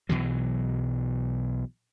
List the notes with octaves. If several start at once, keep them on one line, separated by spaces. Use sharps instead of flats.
B1 B2 E3 F#3